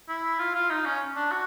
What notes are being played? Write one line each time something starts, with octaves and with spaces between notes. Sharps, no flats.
E4
F4
F4
D#4
C#4
D4
F#4